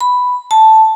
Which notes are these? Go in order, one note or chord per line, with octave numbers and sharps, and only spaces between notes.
B5
A5